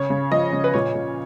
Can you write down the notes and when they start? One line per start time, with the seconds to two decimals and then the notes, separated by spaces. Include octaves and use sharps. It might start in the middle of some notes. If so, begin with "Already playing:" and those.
Already playing: C#3 C#5
0.10 C#3
0.31 F3 D#5
0.53 C#3
0.64 B4
0.74 A#2 C#5
0.95 A#2